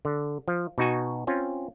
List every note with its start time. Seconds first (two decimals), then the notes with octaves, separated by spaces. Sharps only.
0.05 D3
0.48 F3
0.78 B2 D#4 F#4 G#5
1.27 C4 C#4 F4